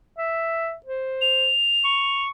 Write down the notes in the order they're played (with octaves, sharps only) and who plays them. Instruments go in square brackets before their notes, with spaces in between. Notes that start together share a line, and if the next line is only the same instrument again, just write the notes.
[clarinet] E5
C5
[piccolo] F7
[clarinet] C#6